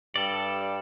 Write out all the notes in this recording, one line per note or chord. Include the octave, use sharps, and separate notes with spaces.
G2 A4 D5